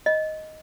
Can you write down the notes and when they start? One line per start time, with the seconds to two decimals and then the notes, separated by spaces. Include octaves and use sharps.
0.06 D#5